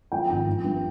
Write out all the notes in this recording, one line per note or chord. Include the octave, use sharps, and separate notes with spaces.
F3 G5
G#1
F3
G2